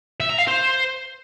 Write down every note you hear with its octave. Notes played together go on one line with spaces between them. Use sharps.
E5
A#5
F5
C5